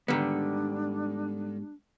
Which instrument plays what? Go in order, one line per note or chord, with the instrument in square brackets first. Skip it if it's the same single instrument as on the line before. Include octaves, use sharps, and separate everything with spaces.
[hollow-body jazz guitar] G#2 G3 B3 [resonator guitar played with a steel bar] D3 D#3 [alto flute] D4